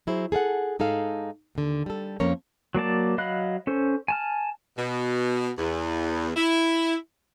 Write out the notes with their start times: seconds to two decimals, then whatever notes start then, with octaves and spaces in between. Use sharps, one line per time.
0.07 F#3 E4 G#4 C5
0.32 G#4 A4 F5 F#5
0.79 G#2 D#4 G#4 A4 F5
1.55 D#2 D3
1.86 G3 A4
2.20 F2 F3 A#3 C#4 A#4 C#5
2.75 F#3 A#3 D5 A5
3.18 F#3 D#5 F5 B5 F#6
3.67 C#4 A4 C5
4.08 G#5 A5 F6
4.77 B2
5.58 E2
6.37 E4